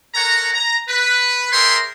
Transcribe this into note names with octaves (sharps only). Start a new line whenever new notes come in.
A4 A#4 C#5 F#5 A#5
A#5
B4
G#4 A#4 C#5 E5 G5 C6